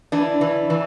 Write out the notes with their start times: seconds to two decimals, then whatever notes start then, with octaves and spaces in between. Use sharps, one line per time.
0.12 E3 D4
0.41 E3
0.70 E3